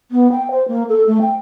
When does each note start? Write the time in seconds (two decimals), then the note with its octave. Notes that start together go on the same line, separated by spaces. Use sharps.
0.11 B3
0.32 G5
0.51 C5
0.68 A#3
0.89 A4
1.07 A3
1.21 G5